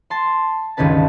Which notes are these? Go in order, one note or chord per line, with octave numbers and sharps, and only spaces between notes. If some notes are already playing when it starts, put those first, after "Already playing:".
A5 C6
G1 C#2 D#3 C#4 B4 A5